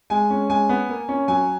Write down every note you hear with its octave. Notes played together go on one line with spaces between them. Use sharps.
G#3 G#5
C#4
G#3 G#5
B3
A#3
C#4
F#3 G#5